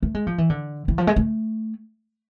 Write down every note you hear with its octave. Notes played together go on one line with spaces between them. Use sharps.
A3
G#3
F3
E3
D3
E3
F3
G#3
A3